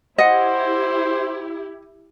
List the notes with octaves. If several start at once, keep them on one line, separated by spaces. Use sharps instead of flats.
E4 G4 C5 D#5 F#5